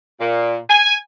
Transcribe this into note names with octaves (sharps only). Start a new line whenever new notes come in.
A#2
G#5